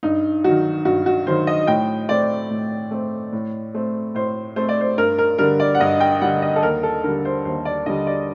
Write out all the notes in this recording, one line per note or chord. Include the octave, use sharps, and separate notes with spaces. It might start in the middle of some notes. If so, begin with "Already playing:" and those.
G2 D#4
D#3 F#3 F#4
G2 F#4
F#4
D#3 F#3 C5
D#5
A2 G5
A3 C4 D5
A2
A3 C4
A2
A3 C4
A2 C5
A3 C4 C5
D5
C5
G2 A#4
A#4
D3 G3 A#4
D5
F#5
G2 D#5
G5
D3 G3 F#5
D#5
A4
D#2 A#4
A4
D3 G3 A#4
C5
D#2 C5
D5
D3 G3 D#5
D5